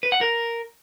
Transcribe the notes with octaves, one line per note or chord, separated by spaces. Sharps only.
B4
F#5
A#4